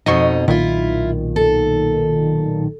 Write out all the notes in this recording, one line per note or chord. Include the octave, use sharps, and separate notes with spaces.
F2 B2 D#4 D#5 C#6
B1 A#2 D#3 E4 F4
A4